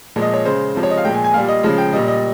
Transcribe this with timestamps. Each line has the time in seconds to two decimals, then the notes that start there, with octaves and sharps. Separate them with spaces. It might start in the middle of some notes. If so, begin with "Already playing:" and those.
0.16 A#2 F3 G#3
0.22 D#5
0.34 C#5
0.45 C#3 G#3 C5
0.75 C3 F3 G#3
0.83 C#5
0.90 D#5
0.97 F5
1.04 A#2 F3 G#3 G5
1.14 G#5
1.24 G#5
1.34 A#2 G3 F5
1.48 D#5
1.63 C#3 F3 G#3
1.78 G5
1.93 A#2 G3 D#5
2.08 D#5